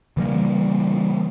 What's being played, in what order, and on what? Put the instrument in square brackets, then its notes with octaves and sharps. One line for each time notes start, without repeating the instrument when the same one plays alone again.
[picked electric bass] C#3 E3 G3 A#3